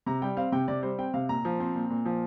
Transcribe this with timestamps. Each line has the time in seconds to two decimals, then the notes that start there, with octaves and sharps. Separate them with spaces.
0.06 C3 A#5
0.22 G3 G5
0.37 C4 F5
0.52 C3 G5
0.68 C3 D5
0.83 G3 C5
0.99 C4 G5
1.14 C3 F5
1.29 A#2 A#5
1.45 F3
1.60 C4
1.75 A#2
1.90 A#2
2.05 F3